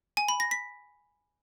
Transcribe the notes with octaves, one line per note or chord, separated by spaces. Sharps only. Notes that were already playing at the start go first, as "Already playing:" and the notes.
G#5
B5
A#6
B6